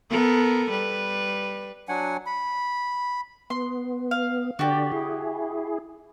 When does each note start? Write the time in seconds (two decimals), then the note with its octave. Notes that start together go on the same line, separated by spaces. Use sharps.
0.10 B3 A4 A#4
0.71 G3 B4
1.89 F#3 D4 F#5 G#5
2.26 B5
3.50 B3 C6
4.11 F5
4.59 D3 F#4 G4 D5
4.92 E4 G#4